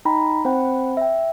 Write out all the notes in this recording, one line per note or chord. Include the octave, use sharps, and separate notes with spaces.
D#4 G5 A#5 B5
C4 C5 F#5 G5 B5
E5 G5